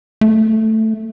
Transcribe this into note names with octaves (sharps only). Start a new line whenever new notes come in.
A3